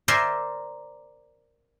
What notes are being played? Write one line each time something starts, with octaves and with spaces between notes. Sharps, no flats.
A#4 C5 D5 E5 G#5 C6